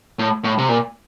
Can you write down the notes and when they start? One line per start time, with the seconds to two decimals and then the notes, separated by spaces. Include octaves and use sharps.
0.19 A2
0.44 A2
0.58 C3
0.69 A#2